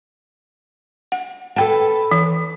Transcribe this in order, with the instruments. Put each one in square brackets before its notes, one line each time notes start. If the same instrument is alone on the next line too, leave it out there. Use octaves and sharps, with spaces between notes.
[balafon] F#5
[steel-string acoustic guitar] A4 B4 A5 [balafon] F#5 G5
[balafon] E3